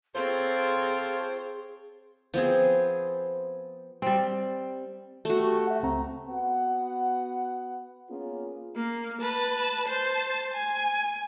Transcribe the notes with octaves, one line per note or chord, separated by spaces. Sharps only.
C4 F4 G#4 A4 C5 C#5
F3 B3 C4 G#4
G3 C4
A3 F#4
G4
E5 F#5
C#2 C4 A#5
B3 F#4 F#5
A#3 B3 C#4 F4 G#4
A#3
B4 A5
C5 A5
G#5